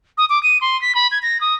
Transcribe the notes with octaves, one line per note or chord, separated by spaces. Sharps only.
D#6
D6
D#7
C6
B6
B5
G#6
A#6
D#6